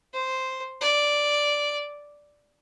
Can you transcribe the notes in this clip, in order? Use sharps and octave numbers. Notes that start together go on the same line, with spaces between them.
C5
D5